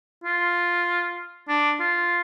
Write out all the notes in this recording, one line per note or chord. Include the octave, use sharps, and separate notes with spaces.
F4
D4
F4